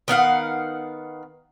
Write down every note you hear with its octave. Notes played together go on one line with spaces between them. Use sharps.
D#3 B3 F5 F#5